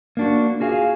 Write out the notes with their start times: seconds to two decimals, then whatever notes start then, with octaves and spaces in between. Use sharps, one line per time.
0.17 A#3 D4 F#4
0.60 F4 F#4 G#4 E5 F5